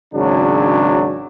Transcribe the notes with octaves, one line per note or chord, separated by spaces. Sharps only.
G#1 C#3 F#3 D4